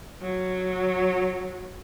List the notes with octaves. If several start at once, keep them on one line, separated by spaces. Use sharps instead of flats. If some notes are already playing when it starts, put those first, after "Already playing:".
F#3